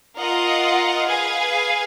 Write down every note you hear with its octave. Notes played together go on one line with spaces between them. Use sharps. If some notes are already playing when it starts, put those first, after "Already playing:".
F4 A#4 D#5 F#5
G#4 B4 F5 G#5